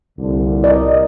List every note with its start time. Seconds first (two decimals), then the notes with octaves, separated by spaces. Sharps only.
0.18 C2 A#2 D3
0.64 A#4 D5 D#5